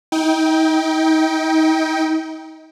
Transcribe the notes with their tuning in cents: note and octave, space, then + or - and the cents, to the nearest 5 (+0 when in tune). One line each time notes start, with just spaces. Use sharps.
D#4 +35 G5 +0